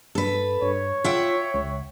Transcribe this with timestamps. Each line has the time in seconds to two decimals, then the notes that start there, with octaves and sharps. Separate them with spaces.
0.15 G2 A4 B4
0.62 G2 C#5
1.04 F4 E5 F#5 G5
1.54 C#2